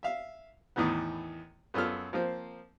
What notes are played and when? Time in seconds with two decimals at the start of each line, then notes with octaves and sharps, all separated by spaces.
0.03 E5 F5
0.76 E2 A2 D#3 E3 B3
1.74 F#2 B3 F4 A4 F6
2.13 F3 A#3 C4